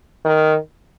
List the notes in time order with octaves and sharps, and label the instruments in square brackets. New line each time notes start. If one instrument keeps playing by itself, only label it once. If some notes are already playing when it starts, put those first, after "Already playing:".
[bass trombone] D#3